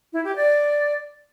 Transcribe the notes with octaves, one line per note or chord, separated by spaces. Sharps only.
E4
G4
D5